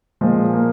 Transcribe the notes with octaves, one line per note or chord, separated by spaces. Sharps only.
A#2 F3 G#3
A#3